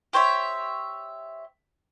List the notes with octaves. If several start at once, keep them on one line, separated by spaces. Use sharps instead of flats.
G4 C5 C#5 E5